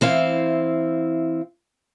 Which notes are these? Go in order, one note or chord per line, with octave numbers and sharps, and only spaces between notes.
E3 C4 E4 F5